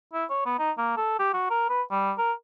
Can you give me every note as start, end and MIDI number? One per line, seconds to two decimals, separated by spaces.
0.13 0.25 64
0.30 0.42 73
0.45 0.55 59
0.59 0.71 63
0.78 0.93 58
0.97 1.15 69
1.19 1.30 67
1.34 1.46 66
1.50 1.67 70
1.69 1.82 71
1.91 2.12 55
2.18 2.33 70